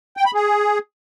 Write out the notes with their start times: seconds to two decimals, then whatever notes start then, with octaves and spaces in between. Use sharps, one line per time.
0.17 G5
0.26 B5
0.34 G#4